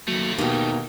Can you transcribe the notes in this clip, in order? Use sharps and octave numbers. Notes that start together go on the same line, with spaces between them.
D#2 F#3 A3 A#3 F#4
B2 A#3 D#4 G4 G5